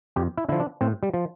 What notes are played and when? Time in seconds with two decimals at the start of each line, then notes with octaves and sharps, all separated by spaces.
0.16 F2 G4
0.37 E4
0.49 D3 F3 E4
0.60 D4
0.81 A2 C4
1.03 G3
1.14 F3